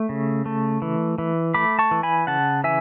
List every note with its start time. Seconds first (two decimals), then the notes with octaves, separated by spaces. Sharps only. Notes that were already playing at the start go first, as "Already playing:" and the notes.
Already playing: A3
0.09 C#3
0.46 A3
0.82 E3
1.18 E3
1.54 A3 B5 D6
1.79 A5 C#6
1.91 E3
2.03 G#5 B5
2.27 C#3 F#5 A5
2.64 E3 E5 G#5